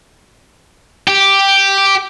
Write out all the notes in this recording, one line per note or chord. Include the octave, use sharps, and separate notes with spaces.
G4